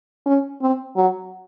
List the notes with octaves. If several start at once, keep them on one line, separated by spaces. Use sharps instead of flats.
C#4
C4
F#3